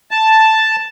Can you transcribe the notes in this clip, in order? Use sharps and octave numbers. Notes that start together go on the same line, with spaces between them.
A5